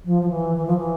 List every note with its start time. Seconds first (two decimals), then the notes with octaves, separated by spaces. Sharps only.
0.05 F3
0.22 F3
0.29 E3
0.55 E3
0.66 F3
0.77 E3